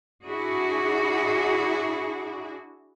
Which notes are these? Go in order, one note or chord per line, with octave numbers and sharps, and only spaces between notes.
D4 E4 F#4 G#4